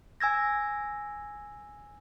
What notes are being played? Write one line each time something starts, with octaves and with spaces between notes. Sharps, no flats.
G#5 E6 G#6 A#6